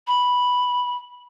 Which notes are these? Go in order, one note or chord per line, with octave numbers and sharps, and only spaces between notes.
B5